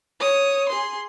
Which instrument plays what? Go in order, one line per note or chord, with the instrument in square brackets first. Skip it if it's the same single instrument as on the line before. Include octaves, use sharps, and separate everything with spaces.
[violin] C#5 D#6
G#4 C6